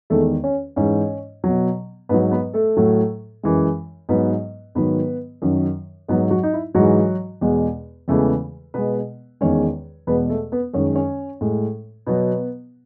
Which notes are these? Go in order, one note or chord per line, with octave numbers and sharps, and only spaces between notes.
E2 D#3 G#3 A3 A4
C#4 C#5
G#2 E3 G#3 C#4 C#5
B2 F#3
G#2 F#3 B3 B4
B3 B4
A3 A4
A2 F#3
F#2 E3 G#3
G#2 F#3 B3 B4
G#2 D#3 F#3 B3 B4
F#2 D#3 F#3
G#2 F#3 B3 B4
F#3 F#4
D#4
E4
G#2 E3 F#3 G#3 F#4
E2 B2 G#3
E2 C#3 E3 G#3 A3 A4
B2 G#3 B3 B4
E2 D#3 G#3 C#4 C#5
E2 B2 G#3 B3 B4
A3 A4
B3 B4
F#2 D#3 G#3 C#5
C#4 C#5
A2 G#3
B2 F#3 B3 B4